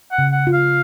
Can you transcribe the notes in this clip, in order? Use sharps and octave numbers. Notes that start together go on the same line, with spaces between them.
F#5
C#3
F#5
F4
F5